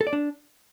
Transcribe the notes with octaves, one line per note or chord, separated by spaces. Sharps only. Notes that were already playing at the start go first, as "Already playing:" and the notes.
A4
D5
D4